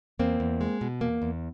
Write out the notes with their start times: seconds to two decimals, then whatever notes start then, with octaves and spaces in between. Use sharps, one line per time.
0.19 E2 A#3 C4
0.40 E2
0.61 G#3
0.81 B2
1.01 E2 A#3
1.22 E2